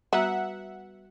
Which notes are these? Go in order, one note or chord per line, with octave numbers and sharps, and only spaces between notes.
G3 B3 F#4 E5 F#5 A#5